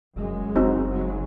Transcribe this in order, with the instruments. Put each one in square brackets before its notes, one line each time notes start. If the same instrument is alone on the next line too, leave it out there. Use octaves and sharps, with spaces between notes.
[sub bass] F1 [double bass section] F#2 G#3
[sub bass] F#1 [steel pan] C4 D#4 F#4
[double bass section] C#3 F#3 G#3